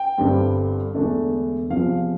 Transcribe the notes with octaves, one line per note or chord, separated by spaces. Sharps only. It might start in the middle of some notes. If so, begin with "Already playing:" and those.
Already playing: G5
G1 G2 D3 G3 C4
E1 E2 D3 A3 D4
E2 C3 F3 F5